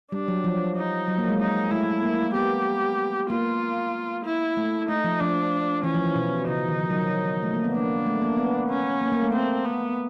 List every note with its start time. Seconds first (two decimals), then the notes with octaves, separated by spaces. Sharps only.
0.12 G3 D4
0.28 F#3
0.44 F3
0.76 D#4
1.08 F#3
1.18 A#3
1.29 G#3
1.39 G#3 D#4
1.71 A3 E4
2.03 A#3
2.34 B3 G4
3.30 A#3 F4
4.25 E4
4.57 A3
4.88 A3 D#4
5.04 F3
5.21 F3 D4
5.83 E3 C#4
5.94 F3
6.05 E3
6.16 B2
6.47 C#3 D#4
6.68 D#3
6.79 F3
6.90 F#3
7.43 A3
7.54 A#3
7.64 B3
7.74 A#3 D4
8.06 A3
8.22 A#3
8.38 B3
8.69 C#4
9.01 A#3
9.12 A#3
9.23 A3
9.33 C4
9.65 B3